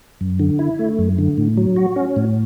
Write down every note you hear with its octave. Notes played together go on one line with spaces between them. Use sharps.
F#2
D3
E4
A3
F#2
D3
A2
F#3
F#4
C#4
A2